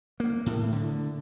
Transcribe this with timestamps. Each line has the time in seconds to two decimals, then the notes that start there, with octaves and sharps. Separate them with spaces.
0.20 A#3
0.46 A2
0.73 D3